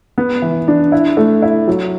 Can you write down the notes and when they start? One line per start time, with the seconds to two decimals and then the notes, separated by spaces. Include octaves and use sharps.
0.18 B3
0.42 E3
0.68 D4
0.92 E4
1.17 A3
1.42 E4
1.68 F#3